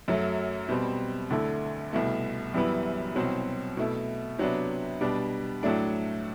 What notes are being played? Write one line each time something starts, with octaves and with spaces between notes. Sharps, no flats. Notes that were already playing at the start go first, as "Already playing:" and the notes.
F#2 F#3 A3
B2 G3 C4
D2 D3 A3 E4
C2 B2 A3
F#2 E3 G3 B3 E4
C2 B2 F#3 C4
B2 A3 E4
C3 F#3 B3 D4
B2 G3 D4
A2 F#3 A3 D4